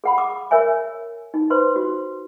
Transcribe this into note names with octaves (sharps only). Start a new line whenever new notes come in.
G#4 F#5 B5
D6
A#4 C#5 E5 G#5
D#4
B4 C5 C6
F#4